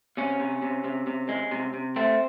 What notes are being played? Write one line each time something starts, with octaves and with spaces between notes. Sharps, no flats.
C3 C#4
C3
C3
C3
C3
G#3
C3
C3
A3 C4